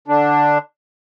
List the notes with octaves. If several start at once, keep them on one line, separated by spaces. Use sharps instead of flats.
D3 D4